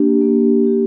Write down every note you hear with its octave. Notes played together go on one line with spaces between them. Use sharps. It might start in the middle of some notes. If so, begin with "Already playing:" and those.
Already playing: A#3 D4 G4
A#3
D4 G4